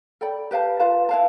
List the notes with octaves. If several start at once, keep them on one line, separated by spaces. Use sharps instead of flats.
A4 D5 G5 B5
G4 B4 F5 A5
F4 B4 F5 A5
E4 B4 F5 A5